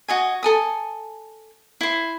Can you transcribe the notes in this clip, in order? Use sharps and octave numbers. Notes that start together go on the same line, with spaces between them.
F#4 D#5 G#5
A4 G#5 D#6
E4 C5